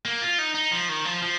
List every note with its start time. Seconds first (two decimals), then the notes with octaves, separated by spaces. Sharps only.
0.05 A#3
0.22 F4
0.38 D#4
0.54 D#4
0.71 F3
0.89 D#3
1.05 F3
1.22 F3